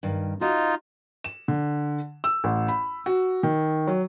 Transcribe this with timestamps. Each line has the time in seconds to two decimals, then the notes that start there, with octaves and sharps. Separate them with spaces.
0.03 G2 D#3
0.41 D#4 F4 F#4 D#5
1.24 E7
1.48 D3
2.24 E6
2.44 A1
2.68 B5
3.06 F#4
3.43 D#3
3.87 F#3